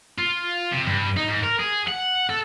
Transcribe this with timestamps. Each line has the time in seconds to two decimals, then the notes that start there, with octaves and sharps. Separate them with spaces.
0.18 F4
0.72 C3
0.86 G2
1.17 D#4
1.28 G#2
1.44 A#4
1.60 G#4
1.88 F#5
2.29 A4